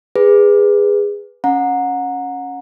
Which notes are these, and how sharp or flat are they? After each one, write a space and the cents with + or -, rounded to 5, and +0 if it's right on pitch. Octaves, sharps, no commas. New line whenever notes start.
G#4 -20 B4 +0
C#4 +0 F#5 -25 A#5 +0